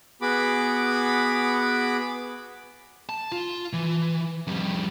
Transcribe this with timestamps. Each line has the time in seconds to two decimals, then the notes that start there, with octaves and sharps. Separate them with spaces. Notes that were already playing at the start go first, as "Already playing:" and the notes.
0.21 B3 F#4 G#4 B5 D6
3.09 A5
3.32 F4
3.73 E3
4.47 F2 G3